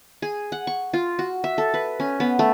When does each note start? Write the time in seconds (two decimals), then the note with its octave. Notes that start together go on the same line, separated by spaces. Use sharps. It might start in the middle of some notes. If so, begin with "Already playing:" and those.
0.22 G#4
0.52 F#5
0.67 C#6
0.93 F4
1.19 F#4
1.44 E5
1.58 A4
1.74 B4
2.00 C#4
2.20 B3
2.39 A3